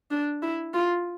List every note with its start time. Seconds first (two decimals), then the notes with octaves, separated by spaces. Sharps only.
0.11 D4
0.42 E4
0.74 F4